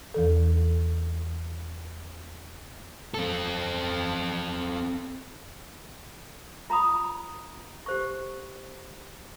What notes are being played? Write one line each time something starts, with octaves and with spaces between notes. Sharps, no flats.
E2 E3 A4
C4 A4
F4 A#5 B5 D#6
G4 C5 C#6